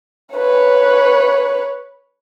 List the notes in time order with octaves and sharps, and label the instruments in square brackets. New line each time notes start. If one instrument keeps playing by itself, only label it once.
[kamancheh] B4 C#5